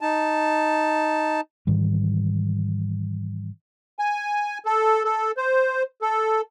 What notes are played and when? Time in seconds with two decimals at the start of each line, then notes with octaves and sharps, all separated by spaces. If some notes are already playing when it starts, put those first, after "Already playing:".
0.01 D#4 A5
1.67 G#2 D#3 E3 G3
3.99 G#5
4.66 A4
5.04 A4
5.37 C5
6.02 A4